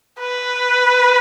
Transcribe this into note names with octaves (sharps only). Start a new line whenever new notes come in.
B4